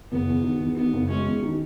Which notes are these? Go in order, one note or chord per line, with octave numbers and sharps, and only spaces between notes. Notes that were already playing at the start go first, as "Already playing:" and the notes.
F#1 B3
E2
D#3
E2
D#3 B3
F#1
G#3 C#4
E2
D#3